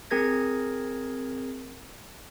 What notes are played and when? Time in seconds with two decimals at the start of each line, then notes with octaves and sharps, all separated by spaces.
0.10 C4 G#4 A#4 G#6 A#6